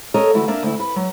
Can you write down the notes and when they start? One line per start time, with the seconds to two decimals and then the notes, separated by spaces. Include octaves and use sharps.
0.14 G4 A4 A#4 C#5 D#5
0.34 D2 E3 E4 F#4 B4
0.48 A#3 D4 A#4 D5 E5
0.63 D2 E4
0.79 B4
0.96 F#3